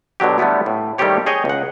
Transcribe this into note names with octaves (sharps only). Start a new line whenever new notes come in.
B2 D3 F#3 G4
D3 G3 A3 B3 E4
A2
D#3 G3 A3 C4 G4 C#5
G#4 C#5 D#5 G5
C#2 F#5